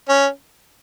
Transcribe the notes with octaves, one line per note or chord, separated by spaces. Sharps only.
C#4